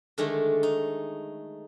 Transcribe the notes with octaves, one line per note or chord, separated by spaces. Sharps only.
D3 D#3 G#3 A3
D#4